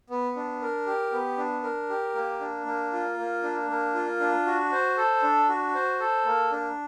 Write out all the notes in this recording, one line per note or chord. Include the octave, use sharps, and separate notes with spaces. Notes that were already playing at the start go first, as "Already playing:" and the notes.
B3
D4
A#4
G4
B3
D4
A#4
G4
A#3
D4
A#3
F4
A#3
D4
A#3
F4
D4
F#4
C5
A4
D4
F#4
C5
A4
A#3
D4